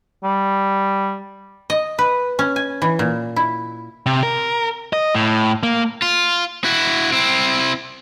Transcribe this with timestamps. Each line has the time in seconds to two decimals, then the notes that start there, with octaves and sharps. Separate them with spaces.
0.24 G3
1.70 D#5
1.99 B4
2.39 C#4
2.56 G#5
2.82 E3
2.99 A#2
3.36 E4
4.06 C3
4.23 A#4
4.93 D#5
5.15 A2
5.63 A#3
6.02 F4
6.64 E4 F#4
7.12 C4 E4